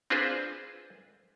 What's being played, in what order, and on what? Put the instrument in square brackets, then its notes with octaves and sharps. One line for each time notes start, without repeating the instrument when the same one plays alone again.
[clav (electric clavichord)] C4 D4 F4 G#4 B4 C5